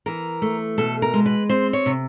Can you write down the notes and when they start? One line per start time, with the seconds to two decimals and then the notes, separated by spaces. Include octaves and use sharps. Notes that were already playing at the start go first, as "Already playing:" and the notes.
0.06 E3 A#4
0.42 A3
0.78 B2 A4
1.02 A#4
1.14 G#3
1.26 B4
1.49 C4 C5
1.73 C#5
1.86 C3